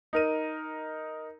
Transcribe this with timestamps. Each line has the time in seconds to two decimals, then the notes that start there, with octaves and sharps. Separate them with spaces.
0.13 D#4 A#4 D#7